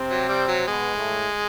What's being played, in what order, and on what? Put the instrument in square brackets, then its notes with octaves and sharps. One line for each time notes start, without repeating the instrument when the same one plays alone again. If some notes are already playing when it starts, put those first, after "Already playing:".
Already playing: [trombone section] C3 C4
[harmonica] F#3
G3
F#3
[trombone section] B2 B3 [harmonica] G#3
[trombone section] A2 A3